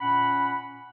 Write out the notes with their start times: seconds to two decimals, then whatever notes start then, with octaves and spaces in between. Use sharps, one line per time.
0.01 A#2 C#4 F#5 B5